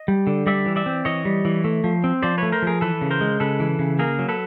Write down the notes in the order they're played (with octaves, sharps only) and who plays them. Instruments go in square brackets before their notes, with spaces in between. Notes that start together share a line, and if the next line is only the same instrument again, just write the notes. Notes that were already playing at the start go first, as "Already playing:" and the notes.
Already playing: [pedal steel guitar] D#5
G3
D3
G3 D5 E5
E3
D5 E5
C4
E3 C#5 D#5
G3
E3
A3
F3
C4
F3 C5 D5
A3 B4 C#5
A#4 C5
F3 G#4 A#4
E3 A4 B4
C#3
A#4 C5
G#3
C#3 A4 B4
E3
C#3
A#3 G#4 A#4
F#3
A4 B4